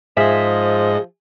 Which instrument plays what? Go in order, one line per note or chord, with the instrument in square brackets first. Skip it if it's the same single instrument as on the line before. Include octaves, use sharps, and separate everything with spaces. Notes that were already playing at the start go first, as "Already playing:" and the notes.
[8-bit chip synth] G#2 D#5 [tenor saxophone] F3 [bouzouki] G#4 E5